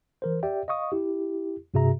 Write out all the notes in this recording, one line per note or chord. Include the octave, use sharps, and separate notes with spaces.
E3 A#4 C5
G4 D5 E5 G5
D#5 F5 C#6 D#6
E4 G4
G2 C3 F#4 G#4 E5 A#5